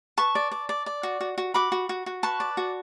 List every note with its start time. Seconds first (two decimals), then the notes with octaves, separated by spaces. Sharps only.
0.18 B4 A5 C#6
0.35 D5
0.51 D5
0.69 D5
0.86 D5
1.03 F#4
1.21 F#4
1.38 F#4
1.54 F#4 B5 D6
1.72 F#4
1.89 F#4
2.06 F#4
2.23 B4 A5 C#6
2.40 D5
2.57 F#4